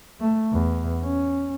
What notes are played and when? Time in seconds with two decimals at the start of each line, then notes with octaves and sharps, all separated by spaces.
0.20 A3
0.53 E2
1.02 C#4